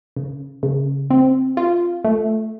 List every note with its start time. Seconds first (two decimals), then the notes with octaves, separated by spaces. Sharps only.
0.17 C#3
0.63 C#3
1.10 C4
1.57 F4
2.04 A3